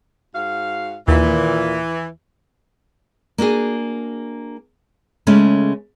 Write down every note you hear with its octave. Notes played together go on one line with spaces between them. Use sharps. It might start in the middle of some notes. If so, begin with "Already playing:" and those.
G#2 F#4 F5
D#2 A#2 E3
A#3 D4 F#4 G#4
C#3 G#3 A3 B3 C#4